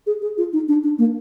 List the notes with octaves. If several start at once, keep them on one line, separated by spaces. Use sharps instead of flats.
G#4
G#4
F4
D#4
D4
D4
A#3